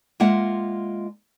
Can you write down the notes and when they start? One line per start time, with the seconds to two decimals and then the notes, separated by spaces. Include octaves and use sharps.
0.20 G#3 A#3 F4 E5 F#5